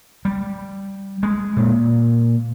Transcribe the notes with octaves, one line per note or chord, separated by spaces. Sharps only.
G3
G#3
A#2